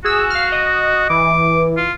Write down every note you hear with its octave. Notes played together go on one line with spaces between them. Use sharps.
F#4 G#4 E6
F5 F6
D#5
E3 D6
F4